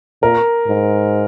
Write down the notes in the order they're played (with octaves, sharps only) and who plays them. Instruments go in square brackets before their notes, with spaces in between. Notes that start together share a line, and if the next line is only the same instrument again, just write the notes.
[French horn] A#2 [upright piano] A#4
[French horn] G#2